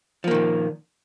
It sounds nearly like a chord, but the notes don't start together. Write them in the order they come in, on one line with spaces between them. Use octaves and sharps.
F3 A#3 D#3 A#2